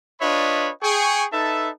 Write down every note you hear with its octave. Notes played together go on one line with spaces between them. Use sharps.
D4 F4 B4 C#5 D#5 B5
G#4 G5 C#6
D#4 A4 B4 E5 A5